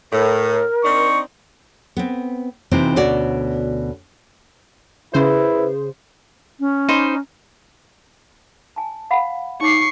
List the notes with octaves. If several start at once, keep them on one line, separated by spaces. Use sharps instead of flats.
A2 A#4
C4 D4 D#4 C#6
B3 C4
C3 E3 C4 D#4 F4
D2 B2 C#4 F#4 D5
C#3 E4 G#4 B4 C5
C#4
D#4 C5 B5
G#5 A5
F5 F#5 B5
D#4 C#5 C#6 D6 C7